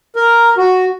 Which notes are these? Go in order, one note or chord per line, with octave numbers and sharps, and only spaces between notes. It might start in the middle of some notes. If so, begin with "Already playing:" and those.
A#4
F#4